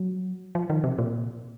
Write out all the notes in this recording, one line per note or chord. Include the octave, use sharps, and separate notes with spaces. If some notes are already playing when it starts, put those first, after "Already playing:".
Already playing: F#3
F3
D#3
C3
A#2